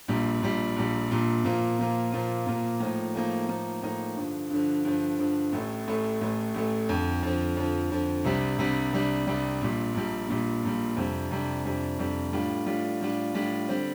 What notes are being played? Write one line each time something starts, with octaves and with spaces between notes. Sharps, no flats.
A#1 A#2 G3
A#1 A#2 G3
A#1 A#2 G3
A#1 A#2 G3
A#2 F3 A#3 F4
A#2 F3 A#3 F4
A#2 F3 A#3 F4
A#2 F3 A#3 F4
A2 F3 A#3 D#4
A2 F3 A#3 D#4
A2 F3 A#3 D#4
A2 F3 A#3 D#4
G2 D3 F3
G2 D3 F3
G2 D3 F3
G2 D3 F3
A1 A2 A3
A1 A2 A3
A1 A2 A3
A1 A2 A3
F2 D3 F3
F2 D3 F3
F2 D3 F3
F2 D3 F3
C2 C3 G3 D4
C2 C3 G3 D4
C2 C3 G3 D4
C2 C3 G3 D4
A#1 A#2 G3
A#1 A#2 G3
A#1 A#2 G3
A#1 A#2 G3
F2 C3 G3 D4
F2 C3 G3 D4
F2 C3 G3 D4
F2 C3 G3 D4
A2 G3 D4 F4
A2 G3 D4 F4
A2 G3 D4 F4
A2 G3 D4 F4
D3 G3 C4